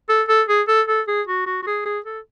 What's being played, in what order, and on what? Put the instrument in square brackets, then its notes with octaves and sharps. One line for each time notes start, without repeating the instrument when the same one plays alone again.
[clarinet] A4
A4
G#4
A4
A4
G#4
F#4
F#4
F#4
G#4
G#4
A4